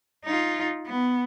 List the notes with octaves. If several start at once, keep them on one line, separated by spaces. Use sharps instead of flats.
D#4 F4
B3